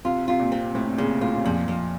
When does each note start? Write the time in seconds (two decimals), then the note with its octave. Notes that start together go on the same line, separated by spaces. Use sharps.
0.05 C3 F4
0.28 C3 F4
0.40 A#2
0.52 C4
0.75 A2 C4
0.87 C3
0.98 A#2 C#3
1.21 A2 F4
1.36 C3
1.44 F2 A#2
1.68 F2